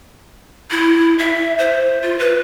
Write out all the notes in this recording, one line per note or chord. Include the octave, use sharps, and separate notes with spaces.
E4
E5
C5
F4
B4